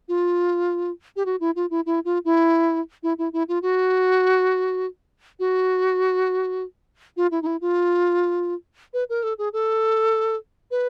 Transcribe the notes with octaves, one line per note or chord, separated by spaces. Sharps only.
F4
G4
F#4
E4
F4
E4
E4
F4
E4
E4
E4
E4
F4
F#4
F#4
F4
E4
D#4
E4
F4
B4
A#4
A4
G#4
A4
B4